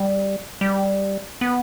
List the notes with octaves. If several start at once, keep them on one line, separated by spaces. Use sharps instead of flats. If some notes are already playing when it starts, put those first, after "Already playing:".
Already playing: G3
G3
B3